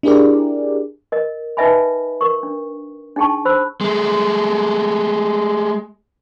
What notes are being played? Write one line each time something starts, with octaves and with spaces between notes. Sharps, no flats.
D4 E4 G4 G#4 A#4 D5
A#4 D#5
D#4 B4 D#5 E5 G#5 B5
A#4 C#6
D4
D4 D#4 G#4 G5 A5 C#6
C5 B5 E6
G#3 A3